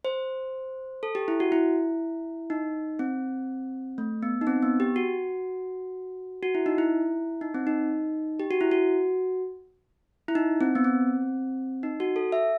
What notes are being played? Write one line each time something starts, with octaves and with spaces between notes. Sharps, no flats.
C5
A4
G4
E4
F#4
E4
D#4
C4
A3
B3
D#4
C4
B3
G4
F#4
F#4
E4
D#4
E4
D#4
C4
D#4
G4
F#4
E4
F#4
E4
D#4
C4
B3
C4
D#4
F#4
A4
E5